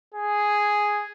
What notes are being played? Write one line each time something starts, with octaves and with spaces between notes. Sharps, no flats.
G#4